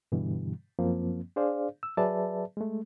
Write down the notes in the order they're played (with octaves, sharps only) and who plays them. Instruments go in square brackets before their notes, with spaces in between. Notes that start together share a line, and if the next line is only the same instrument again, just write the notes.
[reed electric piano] G2 B2 D3 E3 G3
F#2 F3 A#3 C4
D4 G#4 C5 D5 F5
E6
F#3 G#4 B4 D5 E5 A5
G#3 A3